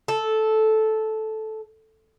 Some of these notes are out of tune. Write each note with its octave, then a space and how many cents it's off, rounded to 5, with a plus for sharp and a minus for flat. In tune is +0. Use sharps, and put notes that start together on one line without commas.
A4 -10